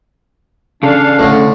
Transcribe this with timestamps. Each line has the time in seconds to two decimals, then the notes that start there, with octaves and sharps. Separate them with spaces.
0.83 C#3 D4 A4 F5
1.19 A2 D3